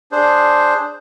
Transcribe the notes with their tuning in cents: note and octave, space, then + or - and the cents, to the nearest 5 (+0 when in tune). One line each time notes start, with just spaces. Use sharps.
D4 +0 G#4 +0 C5 +0